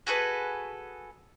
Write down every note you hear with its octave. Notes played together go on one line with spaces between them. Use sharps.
F#4 G#4 A4 B4